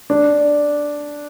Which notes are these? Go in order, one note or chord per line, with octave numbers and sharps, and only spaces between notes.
D4